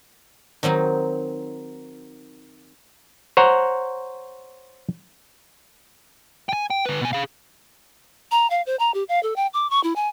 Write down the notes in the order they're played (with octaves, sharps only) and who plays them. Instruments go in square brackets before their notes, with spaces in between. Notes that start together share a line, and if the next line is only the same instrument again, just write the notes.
[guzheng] D#3 F#3 C4 D#4
[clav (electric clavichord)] C5 C#5 F#5 A#5
[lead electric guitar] G5 G#5
G5
D3 B4
B2 G#5
G#4 F5
[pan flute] A#5
F5
C5
A#5
G4
F5
A4
G5
D6
C#6
E4
G#5